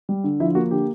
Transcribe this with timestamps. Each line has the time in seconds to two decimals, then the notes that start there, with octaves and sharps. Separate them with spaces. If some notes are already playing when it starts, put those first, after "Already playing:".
0.09 G3
0.24 D3
0.40 F3 E4
0.55 A#3 F#4
0.71 D3 G4